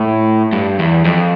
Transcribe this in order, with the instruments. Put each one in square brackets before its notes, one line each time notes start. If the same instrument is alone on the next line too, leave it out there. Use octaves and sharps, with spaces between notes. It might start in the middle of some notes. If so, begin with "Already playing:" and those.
Already playing: [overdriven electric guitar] A2
G2
E2
F2